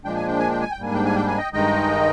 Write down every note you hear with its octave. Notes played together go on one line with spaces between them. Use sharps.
A#2 F3 G#3 D4 G5
G#5
G5
G#5
G5
G#5
G5
G#2 G3 A#3 D4 G#5
G5
G#5
G5
G#5
D#5 G5
G2 D#3 G#3 D#4 D#5 G5